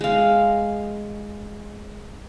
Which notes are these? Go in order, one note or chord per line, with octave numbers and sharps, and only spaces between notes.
G#3 F5